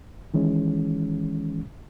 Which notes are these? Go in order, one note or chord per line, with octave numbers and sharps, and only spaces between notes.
D#3 E3 G#3 C#4